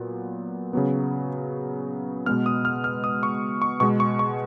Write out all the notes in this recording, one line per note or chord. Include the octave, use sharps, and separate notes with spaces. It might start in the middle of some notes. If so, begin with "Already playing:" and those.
Already playing: A#2 F#3 B3
C#3 F#3 B3
B2 G#3 B3 F6
D#6
F6
F6
D#6
C#6
C#6
B2 G#3 B3 C#6
C#6
C#6